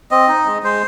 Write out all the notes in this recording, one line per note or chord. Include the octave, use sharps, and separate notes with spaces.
C4 D#5
D#4
G#3
G#3 C5